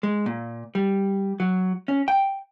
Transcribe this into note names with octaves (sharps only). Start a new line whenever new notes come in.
G#3
A#2
G3
F#3
C#4
G5